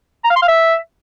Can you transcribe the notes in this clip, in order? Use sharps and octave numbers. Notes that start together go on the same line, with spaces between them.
A#5
F5
C6
F5
E5